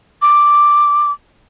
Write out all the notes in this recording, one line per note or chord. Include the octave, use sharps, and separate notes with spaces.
D6